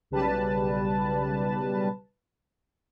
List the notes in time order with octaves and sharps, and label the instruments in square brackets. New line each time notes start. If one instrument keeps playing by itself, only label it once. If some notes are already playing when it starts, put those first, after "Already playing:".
[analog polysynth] B1 C#3 G3 B4 A5